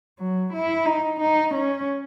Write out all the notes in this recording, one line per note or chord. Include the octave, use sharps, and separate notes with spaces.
F#3
E4
D#4
D#4
C#4